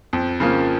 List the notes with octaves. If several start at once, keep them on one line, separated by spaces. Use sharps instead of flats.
F2
C#3 F3 A#3